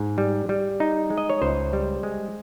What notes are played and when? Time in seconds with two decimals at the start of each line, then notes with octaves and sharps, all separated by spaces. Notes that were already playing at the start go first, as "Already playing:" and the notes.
Already playing: G#2
0.18 G3
0.49 G3
0.80 D#4
1.10 G#3
1.18 D#5
1.30 C#5
1.42 C#2 C5
1.73 G3
2.03 G#3